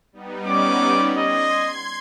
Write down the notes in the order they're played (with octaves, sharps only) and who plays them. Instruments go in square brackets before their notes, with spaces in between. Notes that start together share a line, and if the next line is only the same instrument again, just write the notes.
[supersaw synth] G3 B3 D#4
[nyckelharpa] C#4 D5 [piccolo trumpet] D6
[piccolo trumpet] D#5 [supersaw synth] C6 G#6